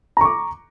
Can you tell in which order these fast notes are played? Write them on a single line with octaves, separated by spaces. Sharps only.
A#5 C#6 D6